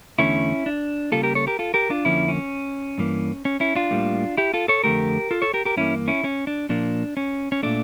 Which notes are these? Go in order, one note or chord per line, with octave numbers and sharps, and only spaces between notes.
E2 D3 A3 C#4 E4
D4
C#3 G3 A#3 F4 A4
G4 A#4
A4 C#5
G4 A#4
F4 A4
G4 A#4
D4 F4
F2 D3 F3 A#3 C#4 E4
C#4
G2 E3 A#3
C#4
C#4 E4
D4 F4
A2 G3 A#3
E4 G4
F4 A4
A4 C#5
F2 D3 A3 G4 A#4
F4 A4
A4 C#5
G4 A#4
G4 A#4
G2 E3 A#3 C#4 E4
C#4 E4
C#4
D4
A#2 F3 A#3 D4
C#4
C#4
A#2 A3 D4